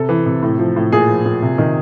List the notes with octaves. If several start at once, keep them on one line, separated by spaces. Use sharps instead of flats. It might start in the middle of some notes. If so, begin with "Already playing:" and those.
Already playing: C3 A4
E3
C3
A2
F3
A2
A#2 G#4
F3
A#2
C3
D#3